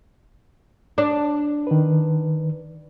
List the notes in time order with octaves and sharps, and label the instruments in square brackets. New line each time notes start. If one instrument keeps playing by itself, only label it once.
[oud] D4
[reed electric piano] D#3 B4